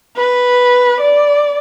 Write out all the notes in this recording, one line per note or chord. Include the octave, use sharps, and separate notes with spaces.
B4
D5